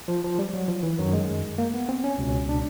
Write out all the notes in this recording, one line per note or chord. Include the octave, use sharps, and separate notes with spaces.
F3
F3
G3
F#3
F3
E3
F#2 D#3 F#3
G#3
A#3
B3
C4
C#4
C#2 B2
D4